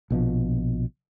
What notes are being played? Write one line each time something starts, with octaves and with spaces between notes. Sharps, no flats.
A#1 B2 F3